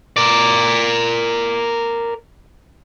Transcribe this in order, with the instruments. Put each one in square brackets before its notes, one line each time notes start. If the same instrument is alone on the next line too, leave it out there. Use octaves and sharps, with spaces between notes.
[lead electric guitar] A#4 D5